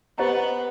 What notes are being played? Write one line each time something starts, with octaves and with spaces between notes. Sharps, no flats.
B3 G4 C5 D#5 F#5 A#5